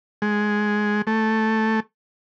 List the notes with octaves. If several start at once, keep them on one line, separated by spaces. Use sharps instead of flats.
G#3
A3